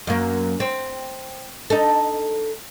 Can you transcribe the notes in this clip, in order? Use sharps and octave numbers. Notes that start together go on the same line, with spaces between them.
F#2 A#3
C4
D#4 A4